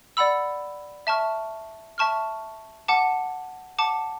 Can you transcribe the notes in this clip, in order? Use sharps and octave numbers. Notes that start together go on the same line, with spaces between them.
D5 F#5 B5 E6
E5 A5 C#6 F6
E5 A5 C#6 F6
F#5 A5 D6
F#5 A5 D6